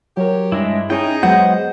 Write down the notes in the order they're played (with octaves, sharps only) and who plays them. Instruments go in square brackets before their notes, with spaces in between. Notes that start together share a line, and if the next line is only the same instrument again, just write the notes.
[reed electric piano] F#3 A#4 [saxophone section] G4 C#5
[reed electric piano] G2 [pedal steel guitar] G#3 D4 E4
[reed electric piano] C#4 E4 [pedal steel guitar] D#4 G5 [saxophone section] G#4
[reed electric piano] F#3 G#3 B3 [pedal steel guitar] C5 D#5 G6 [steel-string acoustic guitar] F#5